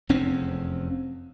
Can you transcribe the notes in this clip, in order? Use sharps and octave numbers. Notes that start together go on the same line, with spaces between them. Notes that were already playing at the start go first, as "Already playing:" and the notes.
F1 E2 C4 C#4